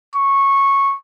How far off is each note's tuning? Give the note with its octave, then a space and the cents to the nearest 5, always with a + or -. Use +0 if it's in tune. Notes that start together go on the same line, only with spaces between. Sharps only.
C#6 -10